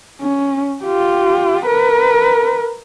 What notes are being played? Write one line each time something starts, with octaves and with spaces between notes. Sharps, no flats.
C#4
F4 G4
A#4 B4